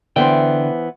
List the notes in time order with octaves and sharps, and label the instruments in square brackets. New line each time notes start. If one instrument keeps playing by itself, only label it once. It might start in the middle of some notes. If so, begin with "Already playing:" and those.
[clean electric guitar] D3 D5 G5 [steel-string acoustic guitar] E3 B3 C5